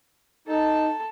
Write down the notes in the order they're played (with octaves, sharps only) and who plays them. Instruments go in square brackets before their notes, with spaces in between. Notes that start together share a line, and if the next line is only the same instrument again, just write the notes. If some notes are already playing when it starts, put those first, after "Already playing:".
[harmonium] D#4 [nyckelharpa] A4 A5